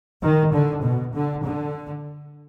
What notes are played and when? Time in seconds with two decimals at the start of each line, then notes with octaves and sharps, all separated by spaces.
0.22 D#3
0.53 D3
0.82 B2
1.14 D3
1.45 D3